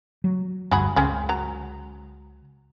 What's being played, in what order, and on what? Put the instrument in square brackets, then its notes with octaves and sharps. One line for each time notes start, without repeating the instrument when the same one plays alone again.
[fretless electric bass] F#3
[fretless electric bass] F1 D2 G2 [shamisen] F#3 G#4 B5
[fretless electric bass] C#2 [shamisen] C4 C#4 G#4
[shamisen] F#3 A#5